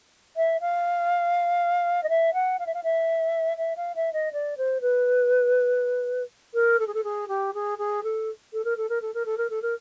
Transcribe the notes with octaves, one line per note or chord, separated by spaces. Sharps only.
E5
F5
D#5
E5
F#5
F5
E5
F5
E5
E5
F5
E5
D#5
D5
C5
B4
A#4
A4
G#4
A4
G#4
G4
G#4
G#4
A4
A4
A#4
A4
A#4
A4
A#4
A4
A#4
A4
A#4